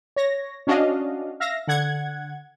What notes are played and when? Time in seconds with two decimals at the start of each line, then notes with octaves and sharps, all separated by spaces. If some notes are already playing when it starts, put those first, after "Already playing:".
0.16 C#5 A#6
0.67 C#4 D4 F#4 D#5 F5
1.40 E5 F5 A#6
1.67 D3 F#5 G#6